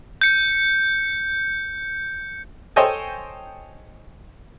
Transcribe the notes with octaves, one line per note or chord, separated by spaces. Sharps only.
G6 C#7
A4 C5 C#5 D#5 G5 G#5